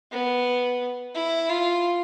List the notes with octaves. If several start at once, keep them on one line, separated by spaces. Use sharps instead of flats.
B3
E4
F4